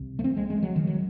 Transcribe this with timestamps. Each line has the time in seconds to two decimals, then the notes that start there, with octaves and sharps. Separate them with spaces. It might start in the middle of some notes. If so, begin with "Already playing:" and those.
Already playing: C2 C3
0.19 A3
0.24 C4
0.37 G#3
0.50 G#3
0.63 F#3
0.76 D#3
0.87 F#3